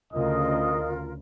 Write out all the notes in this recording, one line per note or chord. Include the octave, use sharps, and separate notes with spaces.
D2 C#3 F4 A#4 D#5